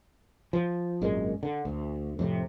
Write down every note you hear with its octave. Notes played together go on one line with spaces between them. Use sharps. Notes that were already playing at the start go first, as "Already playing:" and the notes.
F3
G#1 F#2 A#2 G#3
D3
D2
F2 A2 C3